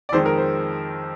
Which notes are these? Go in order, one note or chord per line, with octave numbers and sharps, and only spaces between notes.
D5
F2 D#3 G#3 C5
A#4
C5